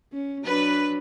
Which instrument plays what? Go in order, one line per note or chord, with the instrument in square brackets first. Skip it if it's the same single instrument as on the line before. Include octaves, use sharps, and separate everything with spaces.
[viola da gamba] C#4
[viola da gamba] F#3 D4 [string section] B4